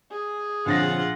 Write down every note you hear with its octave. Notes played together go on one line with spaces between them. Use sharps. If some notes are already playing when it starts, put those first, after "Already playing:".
G#4
A#1 D3 C4 C#4 F4 F#5 A6 A#6